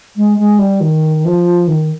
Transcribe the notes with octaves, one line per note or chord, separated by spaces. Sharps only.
G#3
G#3
G3
D#3
F3
D#3